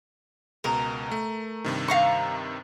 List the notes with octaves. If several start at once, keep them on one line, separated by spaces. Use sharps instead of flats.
C#2 B2 A#4
A3
G2 C3 D#3
F5 A#5 C#6